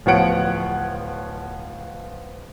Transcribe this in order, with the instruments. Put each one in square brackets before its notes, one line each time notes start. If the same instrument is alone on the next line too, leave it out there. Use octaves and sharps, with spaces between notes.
[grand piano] D1 F3 B3 C#5 F#5 D7